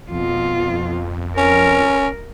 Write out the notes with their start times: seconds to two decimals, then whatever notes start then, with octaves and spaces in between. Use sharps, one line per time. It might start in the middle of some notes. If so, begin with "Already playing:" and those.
0.11 F2 B2 F4
1.37 C#4 A#4